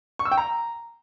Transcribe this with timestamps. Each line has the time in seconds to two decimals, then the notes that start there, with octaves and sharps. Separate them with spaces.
0.19 C#6
0.25 E6
0.31 G5
0.38 A#5